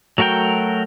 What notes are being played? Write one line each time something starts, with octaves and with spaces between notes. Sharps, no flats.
F#3 A3 F#4 A#4 G5